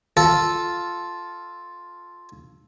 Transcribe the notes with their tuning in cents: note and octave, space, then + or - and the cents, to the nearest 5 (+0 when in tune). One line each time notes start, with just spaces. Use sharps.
F4 +0 A4 -5